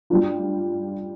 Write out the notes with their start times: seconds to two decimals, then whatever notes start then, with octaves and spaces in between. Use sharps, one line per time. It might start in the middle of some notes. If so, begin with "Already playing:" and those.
0.10 G3 D4 F4